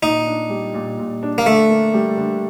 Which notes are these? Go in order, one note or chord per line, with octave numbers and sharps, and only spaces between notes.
A#2 D#4
D4
G3
A#2
A#2
D4
A#3
D3 A3
A#3
G3
D3